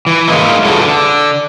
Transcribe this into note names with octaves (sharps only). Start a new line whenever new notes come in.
E3
G#3 A#3 D#4 E4
D3 E3 G#3 F#4 A4
D3